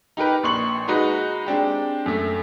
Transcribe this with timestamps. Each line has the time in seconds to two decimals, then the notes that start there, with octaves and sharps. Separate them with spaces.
0.17 D#4 G4 A#4 B4
0.44 A#1 C6 C#6 F#7
0.88 G#3 D#4 F#4 B4 D#5
1.46 G#3 C4 D4 G4
2.06 F#2 A3